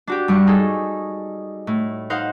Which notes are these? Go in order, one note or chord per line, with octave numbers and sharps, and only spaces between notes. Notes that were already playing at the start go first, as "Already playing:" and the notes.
D4 F#4 G4
G2 G3 C#6
D#4 G#4 A4
A2
D#4 C5 F5 F#5